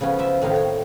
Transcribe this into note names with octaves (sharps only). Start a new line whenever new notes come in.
C#3 F3 B3 C#4
F3 E5
A2 C3 D#3 D#4 F5
C#5